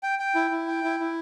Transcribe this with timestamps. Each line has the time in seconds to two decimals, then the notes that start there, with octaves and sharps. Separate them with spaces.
0.03 G5
0.19 G5
0.35 E4
0.51 E4
0.68 G5
0.84 E4
1.00 E4